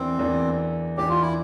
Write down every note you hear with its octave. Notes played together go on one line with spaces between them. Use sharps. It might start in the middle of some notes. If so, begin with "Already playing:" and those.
Already playing: E2 E3 A#3 C4 D4
E2 E3 A#3 D4
E2 E3 A#3 D4 G4
F4
E4